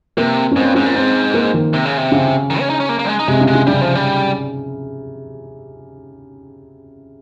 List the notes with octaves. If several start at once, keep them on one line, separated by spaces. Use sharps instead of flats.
C3 A#3
C#4
G#2 C4
G2
G#2 C#4
A#2
G#2 C4
A#3
D#3
C3
C#3
C3
C#3
D#3
C#4
D#4
C#4
A#3
A#3
G3
G#3
D#4
C3 G#3
C#3
G#3
C#3
C#3 G3
F3
G3